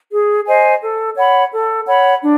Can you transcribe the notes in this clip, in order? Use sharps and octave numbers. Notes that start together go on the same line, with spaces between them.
G#4
C5 D#5 G#5
A4
C#5 F#5 B5
A4
C#5 F#5 B5
D4